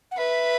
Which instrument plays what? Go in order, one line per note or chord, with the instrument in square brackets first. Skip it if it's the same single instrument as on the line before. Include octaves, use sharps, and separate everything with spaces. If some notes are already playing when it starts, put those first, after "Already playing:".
[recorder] F#5
[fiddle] B4 [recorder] E5